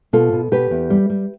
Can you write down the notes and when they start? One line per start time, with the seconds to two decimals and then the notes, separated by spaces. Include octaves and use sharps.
0.13 B2 F4 A4
0.32 B2
0.51 B2 G4 B4
0.71 E2
0.90 G3
1.10 G3